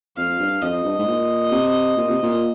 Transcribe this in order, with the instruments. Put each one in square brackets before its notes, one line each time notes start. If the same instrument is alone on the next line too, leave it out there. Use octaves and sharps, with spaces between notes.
[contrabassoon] F2 [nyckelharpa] F5
[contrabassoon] G2
[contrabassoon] F2 [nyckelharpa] D#5
[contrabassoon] G2
G#2
A#2
C3
A#2
C3
A#2